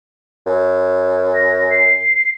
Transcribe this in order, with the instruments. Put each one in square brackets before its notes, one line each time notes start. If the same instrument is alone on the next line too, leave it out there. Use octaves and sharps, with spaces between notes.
[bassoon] F#2
[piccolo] A#6
C7